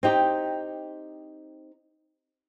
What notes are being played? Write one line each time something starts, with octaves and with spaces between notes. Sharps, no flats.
C4 D#4 G4